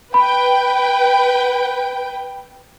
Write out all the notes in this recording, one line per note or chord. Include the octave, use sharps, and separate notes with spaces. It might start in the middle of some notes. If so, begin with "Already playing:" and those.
B4 G5 B5